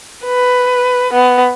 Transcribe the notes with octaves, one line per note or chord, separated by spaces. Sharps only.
B4
B3